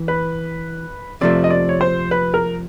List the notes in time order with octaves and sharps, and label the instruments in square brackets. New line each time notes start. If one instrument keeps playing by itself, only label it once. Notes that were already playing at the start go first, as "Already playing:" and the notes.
Already playing: [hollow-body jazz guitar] E3
[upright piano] B4
[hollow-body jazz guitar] F2 C3 F3 A3 [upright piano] D5
[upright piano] D#5
D5
C#5
C5
B4
A#4